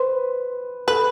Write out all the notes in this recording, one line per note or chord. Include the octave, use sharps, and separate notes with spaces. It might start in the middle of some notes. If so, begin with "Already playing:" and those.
Already playing: B4 C5
A4 B4